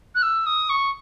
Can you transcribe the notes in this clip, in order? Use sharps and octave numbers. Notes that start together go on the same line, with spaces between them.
F#6
E6
D#6
C#6